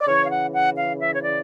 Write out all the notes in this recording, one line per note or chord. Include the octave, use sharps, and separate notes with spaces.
D5
C#3 E3 C#5
F5
F#5
F#5
F5
E5
C#5
D5